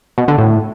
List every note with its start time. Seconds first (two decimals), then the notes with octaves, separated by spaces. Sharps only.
0.18 B2
0.28 D3
0.38 A2